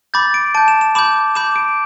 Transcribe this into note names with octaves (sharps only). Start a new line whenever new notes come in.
B5 D6 G6 A6
D7
A5 G6 D7
E7
E7
B5 D6 G6 E7
B5 D6 G6 E7
D7